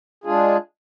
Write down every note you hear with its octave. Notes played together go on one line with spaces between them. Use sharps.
G#3 D4 F4 G#4